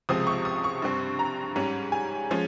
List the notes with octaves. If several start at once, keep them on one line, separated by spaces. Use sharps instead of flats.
C#2 C3 F3 G#3 C4 D#6
C#6
D#6
C#6
G2 G3 C4
A#5
G#2 G3 C#4
G#5
F3 G#3 C#4